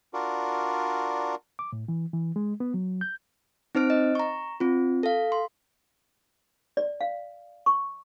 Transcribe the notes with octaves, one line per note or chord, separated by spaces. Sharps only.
D4 F4 F#4 A#4 D5
D6
A2
E3
E3
G#3
B3
F#3
G6
C4 D#4 C5 F6 D7
D#5
A#5 C#6
C4 F4
A4 F5
C6
D5
F5
C#6